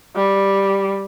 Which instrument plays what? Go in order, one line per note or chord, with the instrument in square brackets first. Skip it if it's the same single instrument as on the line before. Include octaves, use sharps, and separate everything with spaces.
[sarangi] G3